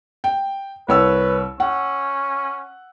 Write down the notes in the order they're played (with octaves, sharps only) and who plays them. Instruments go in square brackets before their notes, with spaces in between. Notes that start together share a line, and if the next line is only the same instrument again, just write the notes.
[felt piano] G5
[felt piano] C2 C#5 E6 [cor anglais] B4
[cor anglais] C#4 [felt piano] F#5